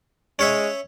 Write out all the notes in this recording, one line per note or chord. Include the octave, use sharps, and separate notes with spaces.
G#3 C#4 C#5 E5